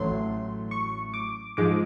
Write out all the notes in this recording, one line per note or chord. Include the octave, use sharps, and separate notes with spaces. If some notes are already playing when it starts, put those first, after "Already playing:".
Already playing: A1 A2 F#3 A3 C6
C#6
D6
G#2 F3 G#3 D6